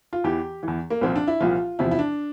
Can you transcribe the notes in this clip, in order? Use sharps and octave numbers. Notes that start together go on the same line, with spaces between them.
F4
E2 E3 G4
E2 E3
A#3
C2 A#2 F3 C4
D4
E4
C2 A#2 F3 F4
E2 C3 F3 E4
E4
D4